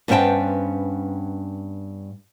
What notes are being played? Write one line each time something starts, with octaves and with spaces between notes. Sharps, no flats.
G2 B3 C#4 C5 G5 A5